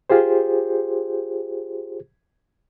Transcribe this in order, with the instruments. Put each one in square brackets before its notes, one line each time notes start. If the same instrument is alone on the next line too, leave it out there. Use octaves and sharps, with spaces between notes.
[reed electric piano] F4 G4 G#4 C5